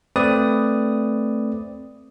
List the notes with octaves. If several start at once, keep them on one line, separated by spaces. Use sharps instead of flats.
A3 C4 B4 D5 D#6